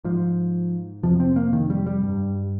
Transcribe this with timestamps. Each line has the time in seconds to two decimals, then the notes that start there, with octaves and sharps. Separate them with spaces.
0.04 G#2 F3
1.03 F2 C3 F3
1.20 C4
1.36 A#3
1.53 D#3
1.70 G3
1.87 G3
2.03 G2